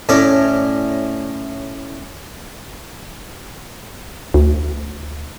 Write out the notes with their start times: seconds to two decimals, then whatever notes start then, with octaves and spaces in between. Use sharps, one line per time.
0.09 A2 C#4 D5
4.34 D2